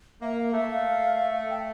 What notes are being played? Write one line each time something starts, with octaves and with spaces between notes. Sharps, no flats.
A#3 E5
F5
A3 E5
F5
G5